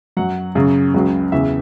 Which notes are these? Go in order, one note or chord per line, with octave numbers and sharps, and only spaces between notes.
F#2 F#3 F#5
F#2 C#3 F#3
C#2 C#3 F#3
E2 C#3 E3 E5